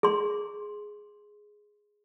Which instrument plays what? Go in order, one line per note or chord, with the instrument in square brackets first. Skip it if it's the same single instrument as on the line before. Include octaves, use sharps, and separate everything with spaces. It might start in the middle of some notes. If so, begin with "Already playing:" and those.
[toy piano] G#4 C6